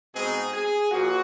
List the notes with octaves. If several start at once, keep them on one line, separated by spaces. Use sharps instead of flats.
B2 G#3 C4 D#4 G#4
G#4
A#2 F3 F#4